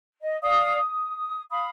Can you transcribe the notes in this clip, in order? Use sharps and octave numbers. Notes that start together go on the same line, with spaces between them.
D#5
D5 F5 D#6
D#6
F5 B5 D#6